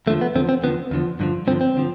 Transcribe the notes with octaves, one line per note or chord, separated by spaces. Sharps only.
E2 D3 F3 A3
B3
E2 D3 F3 C4
C4
E2 D3 F3 B3
E2 D3 F3
G2 D3 F3
G2 D3 F3 C4
C4
D3 F3